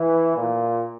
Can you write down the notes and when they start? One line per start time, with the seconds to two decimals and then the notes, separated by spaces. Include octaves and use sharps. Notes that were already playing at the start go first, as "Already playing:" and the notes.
Already playing: E3
0.36 A#2